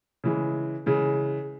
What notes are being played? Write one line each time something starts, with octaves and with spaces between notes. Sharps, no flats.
C#3 E3 G#3
C#3 E3 G#3